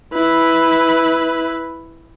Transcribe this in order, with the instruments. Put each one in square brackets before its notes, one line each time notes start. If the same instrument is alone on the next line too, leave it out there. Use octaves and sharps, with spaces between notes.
[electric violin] E4 B4